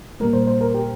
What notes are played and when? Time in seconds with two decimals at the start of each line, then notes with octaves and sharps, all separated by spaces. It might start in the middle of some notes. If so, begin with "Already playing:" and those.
0.20 A#2 G3 A#3 A#4
0.33 C5
0.47 C5
0.61 A#4
0.74 G4